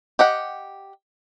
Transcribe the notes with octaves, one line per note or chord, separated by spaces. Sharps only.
G4 D#5 F#5